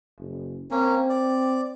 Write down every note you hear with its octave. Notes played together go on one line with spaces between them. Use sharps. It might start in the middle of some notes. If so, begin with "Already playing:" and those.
F#1
A#3 C4 C#4
D5